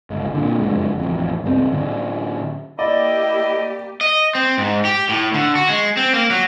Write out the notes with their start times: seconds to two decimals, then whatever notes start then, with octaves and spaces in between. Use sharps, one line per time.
0.10 G1 C#2
0.34 A#2 D3
0.60 F#1 F2 D3 G#3
0.99 A1 F2
1.44 C#2 G2 G3 C4
1.72 A2 D3 C#4
2.79 A#3 E4 G4 D5 D#5
4.01 D#5
4.35 C4
4.58 G#2
4.85 G4
5.09 A2
5.34 D3
5.55 F#4
5.69 G#3
5.97 C4
6.13 A#3
6.30 F#3